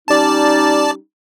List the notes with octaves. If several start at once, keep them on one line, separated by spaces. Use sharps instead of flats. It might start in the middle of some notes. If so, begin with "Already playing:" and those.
G3 C#4 D#4 D5 A5